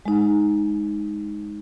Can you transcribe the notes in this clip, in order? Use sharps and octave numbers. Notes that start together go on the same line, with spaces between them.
G#3 D#4